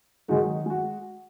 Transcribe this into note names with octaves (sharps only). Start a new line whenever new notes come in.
D#3 F#3 G#3 D#4 F#4
G#3 F#4